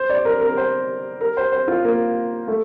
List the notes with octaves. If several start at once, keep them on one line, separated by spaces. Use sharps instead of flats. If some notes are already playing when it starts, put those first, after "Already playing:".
Already playing: C5
D5
A#4
A#4
C5
A#4
C5
C5
F4
A#3
A3